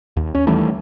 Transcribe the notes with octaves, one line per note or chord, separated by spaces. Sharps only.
D#2
C#4
D#3 E3 G3 A3